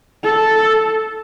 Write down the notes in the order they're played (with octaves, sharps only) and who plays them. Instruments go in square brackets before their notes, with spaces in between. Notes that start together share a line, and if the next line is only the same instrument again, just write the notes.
[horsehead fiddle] A4